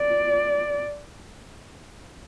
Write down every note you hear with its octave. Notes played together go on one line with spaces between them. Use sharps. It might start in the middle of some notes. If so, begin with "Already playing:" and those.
Already playing: D5